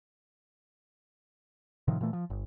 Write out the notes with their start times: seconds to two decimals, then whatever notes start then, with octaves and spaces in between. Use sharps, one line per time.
1.88 A2 C3 D#3 F3
2.01 A#2 E3 A3
2.13 F3
2.30 G1